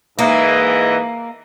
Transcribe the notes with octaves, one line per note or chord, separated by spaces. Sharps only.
G#2 E3 A#3 D#5